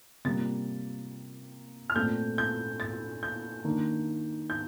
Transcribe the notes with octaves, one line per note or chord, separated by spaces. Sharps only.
C3 G3 A#3 F4 A6
F6
A#2 A3 C4 G6
G6
A6
G6
D#3 A#3 D4
G6